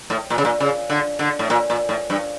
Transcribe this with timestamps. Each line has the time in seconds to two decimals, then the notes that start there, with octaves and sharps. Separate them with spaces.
0.10 A2
0.30 A#2
0.38 C#3
0.45 A#2
0.60 C#3
0.90 D3
1.19 D3
1.39 A2
1.50 A#2
1.70 A#2
1.89 A2
2.10 G2